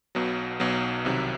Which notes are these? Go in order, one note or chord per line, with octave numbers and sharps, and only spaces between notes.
B1 B2 F#3
B1 B2 F#3
C2 C3 D#3 F#3